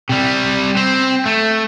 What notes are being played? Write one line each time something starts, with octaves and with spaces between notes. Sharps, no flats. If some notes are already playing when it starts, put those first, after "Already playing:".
C3 G3
C4
A3